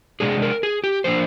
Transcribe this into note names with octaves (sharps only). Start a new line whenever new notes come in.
C3 F3 G#3 D4 G#4
A#4
G#4
G4
F3 A#3 D4 C5